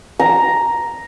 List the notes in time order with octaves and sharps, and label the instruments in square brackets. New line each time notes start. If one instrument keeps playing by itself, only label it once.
[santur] A#5